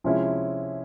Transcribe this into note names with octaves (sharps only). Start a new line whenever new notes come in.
C3 F3 G#3 C#4 E4